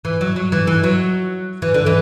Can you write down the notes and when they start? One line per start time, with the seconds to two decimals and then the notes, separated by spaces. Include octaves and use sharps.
0.05 E3
0.21 F#3
0.36 F#3
0.52 E3
0.67 E3
0.84 F#3
1.62 E3
1.74 D3
1.86 E3